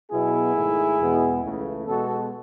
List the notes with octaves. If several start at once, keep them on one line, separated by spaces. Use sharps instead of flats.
B2 F#3 B3 E4 G#4
G#2 D#3 A3
E2 B2 G#3 B3
C#2 C#3 E3 A3
B2 G#3 B3 F#4 A4